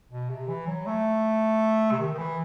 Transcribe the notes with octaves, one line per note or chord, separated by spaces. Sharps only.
B2
C3
E3
F#3
A3
C3
D#3
D#3
E3